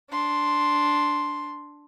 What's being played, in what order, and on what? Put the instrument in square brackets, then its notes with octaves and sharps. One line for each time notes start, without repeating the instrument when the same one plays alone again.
[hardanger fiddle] D4 C6